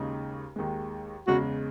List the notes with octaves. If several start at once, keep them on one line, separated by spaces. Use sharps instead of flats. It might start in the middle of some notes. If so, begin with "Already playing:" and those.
Already playing: D#2 C#3 G#3 D#4
D#2 D#3 G#3
E2 C#3 G#3 F#4